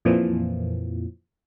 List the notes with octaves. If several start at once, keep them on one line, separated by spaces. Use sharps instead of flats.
F2 A#2 E3 F3